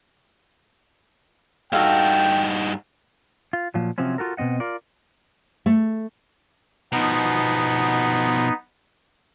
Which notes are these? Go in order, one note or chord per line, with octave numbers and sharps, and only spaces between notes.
G2 D#4 F#4 A4 F5 G5
F4
A#2 F3 F#3
C3 F3 F#3 C4 C#4
F4 F#4 A4 A#4
B2 D#3 C4 D#5 F#5
F4 A#4 D5
A3
B2 F3 B3 D#4